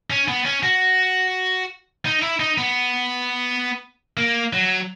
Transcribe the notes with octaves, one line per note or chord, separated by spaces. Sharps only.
C#4
B3
C#4
F#4
D#4
E4
D#4
B3
A#3
F#3